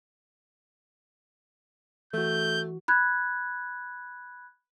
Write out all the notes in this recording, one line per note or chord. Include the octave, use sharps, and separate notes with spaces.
E3 A3 F#4 G6
B5 F#6 G#6